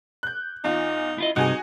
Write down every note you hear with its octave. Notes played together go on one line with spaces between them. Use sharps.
F#6 G6
E2 D#4 F4
E4 F4 D#5
G2 C3 D#4 F#4 G#4 G#5